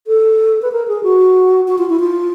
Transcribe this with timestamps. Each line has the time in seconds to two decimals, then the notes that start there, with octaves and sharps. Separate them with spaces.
0.07 A4
0.62 B4
0.72 A#4
0.88 G#4
1.03 F#4
1.68 F#4
1.78 F4
1.89 E4
2.00 F4